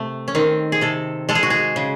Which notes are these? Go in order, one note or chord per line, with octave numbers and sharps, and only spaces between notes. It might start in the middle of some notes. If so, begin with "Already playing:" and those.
Already playing: C3 A3
C#4
D#3 C4
G#4
C3 A4
G#3 A4
G#4
F#4
G#4
C#3